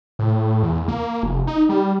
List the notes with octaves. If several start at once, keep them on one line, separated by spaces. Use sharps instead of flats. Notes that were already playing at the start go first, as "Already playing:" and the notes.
A2
E2
A#3
F1
D#4
G3